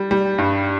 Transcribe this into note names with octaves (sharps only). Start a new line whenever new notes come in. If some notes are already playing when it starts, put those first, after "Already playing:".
Already playing: G3
G3
G2